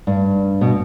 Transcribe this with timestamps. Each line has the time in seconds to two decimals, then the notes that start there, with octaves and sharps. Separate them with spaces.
0.07 G2
0.61 B2